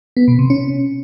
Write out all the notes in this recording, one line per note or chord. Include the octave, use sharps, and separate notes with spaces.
B3
B2
C3
C#4